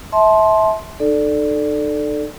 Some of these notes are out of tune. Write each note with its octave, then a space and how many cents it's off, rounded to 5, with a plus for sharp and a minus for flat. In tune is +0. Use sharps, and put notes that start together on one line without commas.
E5 -25 A5 -20 C6 +10
D#4 -45 A4 +0 D5 +0